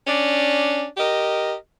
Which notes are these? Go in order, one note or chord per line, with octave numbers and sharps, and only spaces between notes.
C#4 D4 D5
G4 A#4 D#5